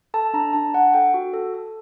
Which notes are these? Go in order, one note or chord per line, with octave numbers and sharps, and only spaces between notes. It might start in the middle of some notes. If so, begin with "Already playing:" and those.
A4 A5
D4 A#5
D4 A5
D4 F#5
A4 G5
F#4
A4
A4